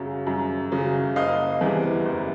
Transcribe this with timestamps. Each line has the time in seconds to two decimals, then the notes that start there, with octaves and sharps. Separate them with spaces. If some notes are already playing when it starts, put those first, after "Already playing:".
Already playing: F#2 C#3 F#3
0.27 F#2
0.72 C#3 F#3
1.16 F#1 D#5 F5
1.61 E2 C3 E3
2.06 F#1